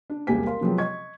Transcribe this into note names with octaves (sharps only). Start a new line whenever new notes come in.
D4
E1 C2 A#3 G4 G#5 B6
A#4 F5 C6
C3 F3 F#3 G#3 B3 C4
D#5 C#6 G#6